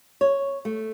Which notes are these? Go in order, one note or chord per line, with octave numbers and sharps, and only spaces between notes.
C#5
A3